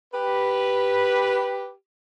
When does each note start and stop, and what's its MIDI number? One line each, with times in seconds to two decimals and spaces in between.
0.14 1.71 67
0.14 1.71 71